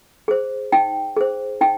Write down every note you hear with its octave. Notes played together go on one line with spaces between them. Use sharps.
G#4 C5
D#4 G5
G#4 C5
D#4 G5